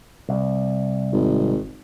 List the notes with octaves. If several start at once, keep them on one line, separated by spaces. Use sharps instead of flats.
C2
G#1